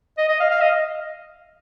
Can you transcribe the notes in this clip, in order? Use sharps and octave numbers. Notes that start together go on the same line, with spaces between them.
D#5
D#5
F5
F5
D#5